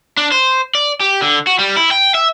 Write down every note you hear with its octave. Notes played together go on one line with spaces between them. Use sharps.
D4
C5
D5
G4
D3
F#4
G3
E4
G5
E5